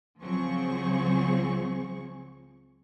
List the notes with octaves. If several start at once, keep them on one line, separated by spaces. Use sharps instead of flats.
C#2 F3 F#3 C4 G#4 C#6